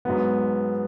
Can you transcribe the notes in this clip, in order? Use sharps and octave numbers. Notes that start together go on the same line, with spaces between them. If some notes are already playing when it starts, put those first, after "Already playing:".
G#2 F#3 B3